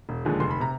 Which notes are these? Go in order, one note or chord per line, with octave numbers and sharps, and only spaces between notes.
E1
D#2 D3 F3 G#3
F1 C6
B5
C3 A#5